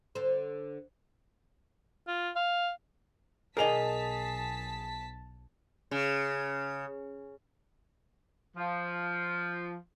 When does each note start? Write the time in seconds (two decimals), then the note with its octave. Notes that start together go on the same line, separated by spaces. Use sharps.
0.15 D3 C5
2.07 F4
2.36 F5
3.57 B1 G#4 A#4 D5 D#5 A5 B6 F7
5.91 C#3
8.57 F3